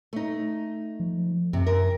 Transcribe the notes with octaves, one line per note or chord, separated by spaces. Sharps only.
A3 D#4
F3
F#2 C3
A#4